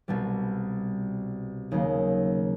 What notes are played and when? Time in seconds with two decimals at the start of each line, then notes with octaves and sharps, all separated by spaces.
0.08 C2 B2 G3
1.71 D#2 C#3 F#3 A#3